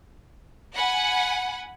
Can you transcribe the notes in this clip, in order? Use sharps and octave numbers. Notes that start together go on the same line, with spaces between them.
F#5 G#5 B5